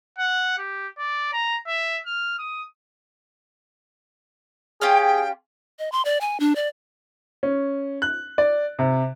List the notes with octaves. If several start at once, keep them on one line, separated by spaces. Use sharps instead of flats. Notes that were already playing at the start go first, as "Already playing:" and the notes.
F#5
G4
D5
A#5
E5
F6
D#6
C#4 F4 G4 G#4 G5
D#5
C6
D5
G#5
D4
D5
C#4
F#6
D5
C3